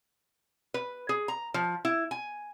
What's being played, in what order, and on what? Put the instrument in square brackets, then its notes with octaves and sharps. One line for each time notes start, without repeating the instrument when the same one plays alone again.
[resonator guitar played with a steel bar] B4
G#4
A#5
F3
E4
G#5